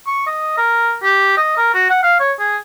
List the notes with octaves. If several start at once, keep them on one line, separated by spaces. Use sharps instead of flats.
C#6
D#5
A#4
G4
D#5
A#4
F#4
F#5
F5
C#5
G#4